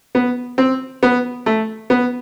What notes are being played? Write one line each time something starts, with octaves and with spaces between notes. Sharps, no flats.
B3
C4
B3
A3
B3